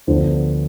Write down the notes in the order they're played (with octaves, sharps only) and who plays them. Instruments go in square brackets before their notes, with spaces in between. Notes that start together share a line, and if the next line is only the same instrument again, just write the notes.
[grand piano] D2 D3 F3 B3 C5